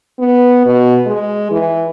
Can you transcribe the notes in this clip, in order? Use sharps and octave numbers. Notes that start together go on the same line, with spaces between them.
B3
B2
G#3
E3